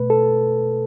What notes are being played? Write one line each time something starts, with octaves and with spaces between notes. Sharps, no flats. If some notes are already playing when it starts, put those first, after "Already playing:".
Already playing: B2 A3 B4
A4